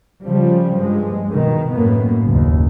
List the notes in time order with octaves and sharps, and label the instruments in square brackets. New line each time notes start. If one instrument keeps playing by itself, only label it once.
[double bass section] C#3 F3 G3
G2 G#3
B2 D#3
F#2 A2 A#3 B3
F#1 D#2